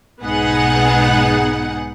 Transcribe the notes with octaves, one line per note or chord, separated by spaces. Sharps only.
B1 G#2 B3 D#4 G#4 F#5